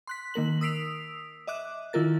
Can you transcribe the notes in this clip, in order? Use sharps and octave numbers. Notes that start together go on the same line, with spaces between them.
C6 F#6 B6
D#3 A#3 A#4 F#7
D#6 E6 B6 C7 D7 F7
D#5 E5 D6 F#6
D#3 E4 F4 A#4 A6